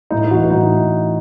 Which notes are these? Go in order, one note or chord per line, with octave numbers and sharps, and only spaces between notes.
A2 D#4
E3 F#4
A2 D#4